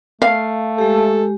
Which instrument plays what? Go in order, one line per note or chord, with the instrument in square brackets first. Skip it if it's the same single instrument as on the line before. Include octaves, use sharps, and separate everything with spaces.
[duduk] A3 [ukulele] F5
[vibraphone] G#3 G4 [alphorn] A4